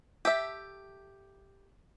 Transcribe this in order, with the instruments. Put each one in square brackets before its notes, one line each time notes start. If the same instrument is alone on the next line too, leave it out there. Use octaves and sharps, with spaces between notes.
[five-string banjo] G4 A4 E5